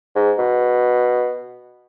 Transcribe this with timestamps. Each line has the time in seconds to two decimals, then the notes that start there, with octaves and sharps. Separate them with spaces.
0.15 G#2
0.38 B2